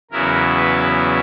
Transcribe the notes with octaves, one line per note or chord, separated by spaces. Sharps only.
E2 C#3 F#3 B3 E4 A#4
B4